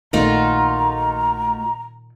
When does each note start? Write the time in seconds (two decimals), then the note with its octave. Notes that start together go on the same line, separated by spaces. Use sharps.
0.13 A#1 A#2 D#3 A3 D#4 F4 F#4 A#5